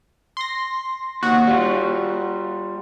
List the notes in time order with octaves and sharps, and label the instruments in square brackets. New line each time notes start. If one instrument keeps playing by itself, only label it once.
[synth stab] C6 A#6
[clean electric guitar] D#2 [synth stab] F#4
[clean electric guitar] G3 F4